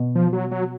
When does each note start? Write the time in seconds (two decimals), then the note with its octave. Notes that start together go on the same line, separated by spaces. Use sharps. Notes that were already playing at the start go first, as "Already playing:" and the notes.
Already playing: B2
0.15 F3
0.33 F#3
0.52 F#3